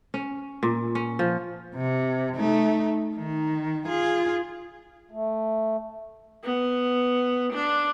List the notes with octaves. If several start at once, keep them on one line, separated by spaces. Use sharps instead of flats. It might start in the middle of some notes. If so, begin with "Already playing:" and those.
C#4
A#2
C#4
F3
C3
A3 D#4
D#3
F4 G#4
A3
B3
D4